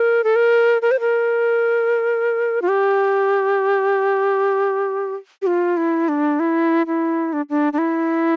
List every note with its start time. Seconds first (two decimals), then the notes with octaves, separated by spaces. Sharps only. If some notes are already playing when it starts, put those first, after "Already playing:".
Already playing: A#4
0.24 A4
0.36 A#4
0.82 A#4
0.91 C5
1.00 A#4
2.62 F4
2.68 G4
5.42 G4
5.47 F4
5.77 E4
6.09 D4
6.40 E4
6.86 E4
7.33 D4
7.50 D4
7.73 D4
7.78 E4